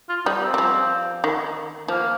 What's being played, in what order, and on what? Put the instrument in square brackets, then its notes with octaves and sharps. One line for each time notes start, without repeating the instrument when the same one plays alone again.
[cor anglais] F4
[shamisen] G3 [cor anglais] D#4
[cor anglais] C4
[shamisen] G3
F3
D#3
[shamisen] F3 [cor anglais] A#3